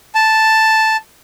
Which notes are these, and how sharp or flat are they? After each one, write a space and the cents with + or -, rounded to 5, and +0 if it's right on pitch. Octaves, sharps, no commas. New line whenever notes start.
A5 +0